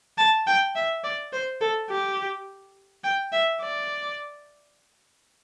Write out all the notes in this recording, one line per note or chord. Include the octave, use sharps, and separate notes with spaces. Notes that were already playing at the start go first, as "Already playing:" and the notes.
A5
G5
E5
D5
C5
A4
G4
G5
E5
D5